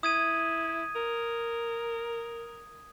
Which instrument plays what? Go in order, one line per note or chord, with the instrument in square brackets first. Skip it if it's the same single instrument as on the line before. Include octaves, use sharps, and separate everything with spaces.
[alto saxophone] E4 [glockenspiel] D#6 G#6 D#7
[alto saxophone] A#4